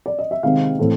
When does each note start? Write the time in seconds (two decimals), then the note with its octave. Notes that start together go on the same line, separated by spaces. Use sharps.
0.06 D5
0.19 D#5
0.31 E5
0.43 C3 D#3 G#3 C4 F5
0.79 A2 E3 A3 C4